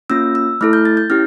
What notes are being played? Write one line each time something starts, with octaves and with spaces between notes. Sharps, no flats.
A#3 C#4 F4 E6
E6
A3 E4 A4 F6
G6
A6
G6
C#4 E4 G4 F6